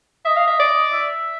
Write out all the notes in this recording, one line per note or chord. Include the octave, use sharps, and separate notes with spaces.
D#5 E5
F5
E5
D5
E5